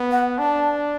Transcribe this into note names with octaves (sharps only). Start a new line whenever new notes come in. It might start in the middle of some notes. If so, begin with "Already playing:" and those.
Already playing: B3
F#5
D4 A5